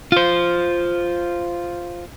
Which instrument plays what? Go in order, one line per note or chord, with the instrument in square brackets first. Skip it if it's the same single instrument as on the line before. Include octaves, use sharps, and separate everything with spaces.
[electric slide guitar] F4 C5